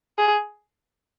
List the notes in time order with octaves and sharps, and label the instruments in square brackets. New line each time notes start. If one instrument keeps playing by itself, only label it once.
[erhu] G#4